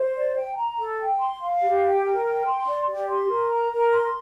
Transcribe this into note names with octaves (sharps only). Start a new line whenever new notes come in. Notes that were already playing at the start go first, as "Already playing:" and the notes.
Already playing: C5
D5
G5
A#5
A4
G5
C6
F5
G4
G5
A#4
G5
C6
D5
G4
C6
A#4
A#5
A#4
C6